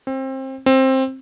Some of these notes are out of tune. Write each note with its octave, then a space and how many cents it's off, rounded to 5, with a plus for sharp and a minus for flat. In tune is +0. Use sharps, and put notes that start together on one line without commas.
C4 +25
C4 +15